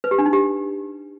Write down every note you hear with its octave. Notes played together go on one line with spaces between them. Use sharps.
B4
G4
D4
D#4
G4